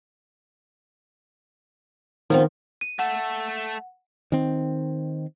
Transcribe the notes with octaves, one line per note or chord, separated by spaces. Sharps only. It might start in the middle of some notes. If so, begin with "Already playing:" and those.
D#3 F3 B3 C4
D#7
A3 A4 F#5
D#3 C4